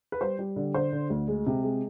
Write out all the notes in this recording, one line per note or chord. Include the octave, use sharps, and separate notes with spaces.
B4
G3 C5
G3
D3
D3 C5
D3
D2
G#3
C3
G#3